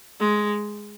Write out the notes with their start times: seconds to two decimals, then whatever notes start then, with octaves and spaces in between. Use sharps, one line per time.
0.20 G#3